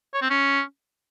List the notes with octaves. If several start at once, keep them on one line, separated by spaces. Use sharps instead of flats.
C#5
C4
C#4